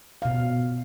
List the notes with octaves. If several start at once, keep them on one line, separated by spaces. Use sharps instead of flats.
B2 F5